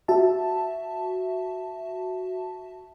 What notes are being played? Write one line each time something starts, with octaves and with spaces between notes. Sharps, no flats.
F#4 E5 A5